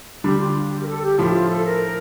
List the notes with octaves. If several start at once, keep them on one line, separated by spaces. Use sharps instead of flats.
D3 G3 D4 G4
F4
F4
G4
A#4
A4
G4
A2 F3 A3 F4
G4
F4
A4
A#4